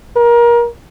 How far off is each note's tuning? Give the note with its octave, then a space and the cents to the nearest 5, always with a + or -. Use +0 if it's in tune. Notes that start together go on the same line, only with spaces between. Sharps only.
A#4 +25